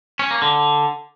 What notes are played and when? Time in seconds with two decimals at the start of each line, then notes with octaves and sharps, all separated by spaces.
0.19 C#4
0.31 A#3
0.42 D3